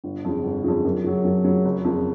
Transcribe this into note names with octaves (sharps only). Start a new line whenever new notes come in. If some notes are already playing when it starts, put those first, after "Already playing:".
G1
F2 C#3
G1
F2 C#3
F#2
C#3 F#3
F#2
C#3 F#3
F#1
F2 C#3